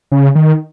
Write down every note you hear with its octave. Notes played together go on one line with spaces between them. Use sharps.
C#3
D#3